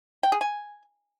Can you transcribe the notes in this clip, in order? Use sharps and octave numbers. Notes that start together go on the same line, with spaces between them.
G5
G#4
G#5